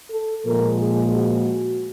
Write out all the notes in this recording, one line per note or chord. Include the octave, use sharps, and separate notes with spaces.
A4
A#2 F3 G#3 A#4
G#4
F#4